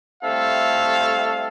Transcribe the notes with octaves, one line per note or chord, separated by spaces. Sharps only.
G3 A3 C4 E4 A4 F5